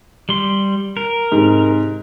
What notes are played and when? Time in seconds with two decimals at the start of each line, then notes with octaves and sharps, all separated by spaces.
0.29 G3 C6
0.97 A#4
1.32 G#2 C3